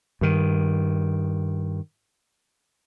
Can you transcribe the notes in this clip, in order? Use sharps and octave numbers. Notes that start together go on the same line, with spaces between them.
G2 D#3